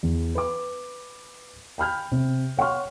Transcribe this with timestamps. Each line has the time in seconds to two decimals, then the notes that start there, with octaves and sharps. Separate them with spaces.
0.03 E2
0.35 B4 D6
1.78 G5 B5 F6 G6
2.12 C3
2.57 C#5 F#5 C6 C#6 F6